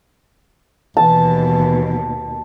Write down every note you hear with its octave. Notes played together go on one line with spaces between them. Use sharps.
D#2 B2 E3 A5